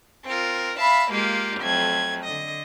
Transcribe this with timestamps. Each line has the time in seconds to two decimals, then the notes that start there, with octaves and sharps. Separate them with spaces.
0.24 C4 F4 A#4
0.79 E5 F5 A5 B5
1.12 G#3 A#3 F4 G4
1.60 F2 F#3 A3 G#6
2.23 D3 D#5